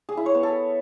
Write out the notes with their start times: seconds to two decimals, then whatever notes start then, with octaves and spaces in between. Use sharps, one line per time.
0.09 G#4
0.17 E4
0.26 C#5
0.35 B3
0.43 A4